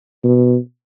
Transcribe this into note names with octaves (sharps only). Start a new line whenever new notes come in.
B2